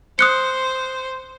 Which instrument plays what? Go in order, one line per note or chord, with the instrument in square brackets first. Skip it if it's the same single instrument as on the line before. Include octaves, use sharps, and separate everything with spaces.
[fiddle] C5 [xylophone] D#6 F#6 C#7